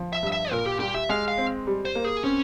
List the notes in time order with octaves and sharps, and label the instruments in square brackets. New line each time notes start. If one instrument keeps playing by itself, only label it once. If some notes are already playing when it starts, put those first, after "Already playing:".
Already playing: [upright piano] F3
[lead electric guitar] E5
[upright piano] G2
[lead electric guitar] E5
[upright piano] A#2 [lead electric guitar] A#4
[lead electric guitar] G4
[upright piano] G3 [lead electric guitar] G4
[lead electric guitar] E5
[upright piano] G#3 [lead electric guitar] F5
[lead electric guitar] F5
[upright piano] C4
G3
[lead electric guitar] C5
[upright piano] A#3
[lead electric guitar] G#4
[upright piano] C4 [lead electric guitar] C#4